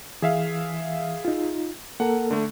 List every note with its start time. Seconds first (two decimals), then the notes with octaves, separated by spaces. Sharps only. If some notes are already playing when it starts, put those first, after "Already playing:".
0.22 E3 G#4 E5 F5
1.25 D#4 F4
2.00 A#3 A4 A#4 F#5
2.31 D3 A3